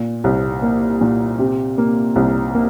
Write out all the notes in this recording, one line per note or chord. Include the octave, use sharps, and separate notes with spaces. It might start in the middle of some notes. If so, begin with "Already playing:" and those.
Already playing: A#2
C2
A#3
A#2
C3
A#3
C2
A#3